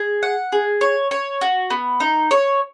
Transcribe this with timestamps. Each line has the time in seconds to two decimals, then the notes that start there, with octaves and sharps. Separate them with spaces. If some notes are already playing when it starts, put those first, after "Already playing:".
Already playing: G#4
0.23 F#5
0.52 G#4
0.81 C#5
1.11 C#5
1.41 F#4
1.70 B3
2.00 D#4
2.31 C#5